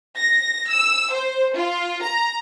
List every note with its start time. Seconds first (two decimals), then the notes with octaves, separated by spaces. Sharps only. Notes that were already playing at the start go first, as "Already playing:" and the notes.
0.17 A#6
0.69 E6
1.12 C5
1.55 F4
2.03 A#5